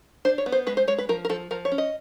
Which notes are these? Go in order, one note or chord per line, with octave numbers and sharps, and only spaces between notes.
D4 C5
C#5
B3
C5
G#3 B4
C5
G#3 C#5
B4
F3 A#4
A#4
F3 A4
F3 A#4
C#5
C#4
D#5